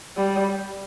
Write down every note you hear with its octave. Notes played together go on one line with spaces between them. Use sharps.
G3